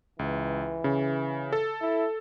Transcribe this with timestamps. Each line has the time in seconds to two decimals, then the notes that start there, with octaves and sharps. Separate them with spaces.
0.19 C#2 E3
0.84 C#3
1.53 A4
1.81 E4